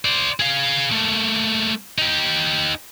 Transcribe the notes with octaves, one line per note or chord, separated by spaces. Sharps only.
C5 D5
G#4 F5
A3 A#3
D#4 G4